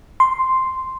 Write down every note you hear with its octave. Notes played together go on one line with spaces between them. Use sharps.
C6